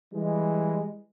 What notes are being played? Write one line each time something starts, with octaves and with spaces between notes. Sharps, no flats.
E3 G3 G#3